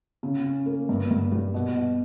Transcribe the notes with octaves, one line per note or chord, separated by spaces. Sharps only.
C#3
C#4
A#3
G2
G2
G3
B2
B2